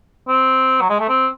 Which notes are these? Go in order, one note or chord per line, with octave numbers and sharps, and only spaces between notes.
C4
F#3
G#3
A3
C4